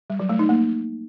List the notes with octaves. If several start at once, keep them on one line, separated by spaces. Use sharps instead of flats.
G3
F#3
A3
D#4
A#3